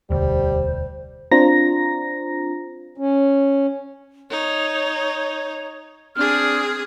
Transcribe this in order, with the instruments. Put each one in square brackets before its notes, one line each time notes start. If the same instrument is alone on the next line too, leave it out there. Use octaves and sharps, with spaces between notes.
[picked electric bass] E1 D2 [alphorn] G3 [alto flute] C5
[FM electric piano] C4 D4 F4 C5 A#5 A#6
[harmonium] C#4
[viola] D#4 [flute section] C#5
[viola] C4 G#4 [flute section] D4 F6